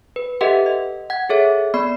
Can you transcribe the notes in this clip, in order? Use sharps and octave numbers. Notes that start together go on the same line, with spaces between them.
B4
G4 A4 B4 D#5 E5 F#5
D#5
F#5 G#6
G#4 A4 C#5 E5
B3 D5 B5 C7